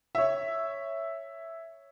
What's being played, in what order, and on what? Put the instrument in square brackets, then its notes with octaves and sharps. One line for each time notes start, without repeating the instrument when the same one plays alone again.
[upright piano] C#5 E5